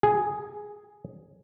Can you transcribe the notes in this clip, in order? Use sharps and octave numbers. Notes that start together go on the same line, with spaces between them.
G#4